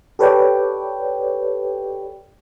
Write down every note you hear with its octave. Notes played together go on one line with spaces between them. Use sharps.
G4 A4 B4 C#5 D5 G5